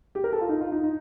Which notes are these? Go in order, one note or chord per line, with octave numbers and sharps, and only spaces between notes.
G4
A#4
A4
F4
D#4
F4
D#4
D#4